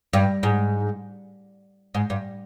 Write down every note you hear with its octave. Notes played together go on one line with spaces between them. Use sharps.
G2
G#2
G#2
G2